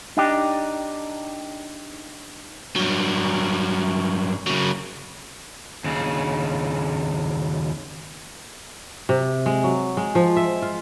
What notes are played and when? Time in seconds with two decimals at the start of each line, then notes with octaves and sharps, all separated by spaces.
0.17 D4 D#4 G4
2.76 G2 F#3
4.47 C#3 F#3
5.84 D#2 C#3
9.09 C3
9.46 G#3
9.64 F#3
9.97 G#3
10.15 F3
10.36 E5
10.62 F4